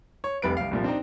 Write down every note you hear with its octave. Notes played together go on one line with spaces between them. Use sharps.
C#5
F1 C2 B4 D7
C2 F5
C2 A#2 F3
C4 D4 D#4